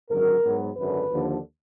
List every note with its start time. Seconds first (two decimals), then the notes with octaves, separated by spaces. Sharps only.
0.10 G#1 F#2 D3 F#3 A#4
0.43 G#2 F#3 B3
0.76 G#1 F#2 D3 B4
1.10 D#2 D3 F3